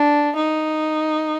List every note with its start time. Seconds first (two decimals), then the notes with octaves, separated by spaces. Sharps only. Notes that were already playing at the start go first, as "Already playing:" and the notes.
Already playing: D4
0.36 D#4